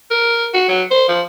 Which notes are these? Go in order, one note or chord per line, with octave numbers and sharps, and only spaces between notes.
A#4
F#4
F#3
C5
F3